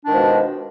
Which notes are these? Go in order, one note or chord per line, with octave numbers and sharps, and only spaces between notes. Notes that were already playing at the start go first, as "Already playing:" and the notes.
B2 D#3 F3 G#3 D4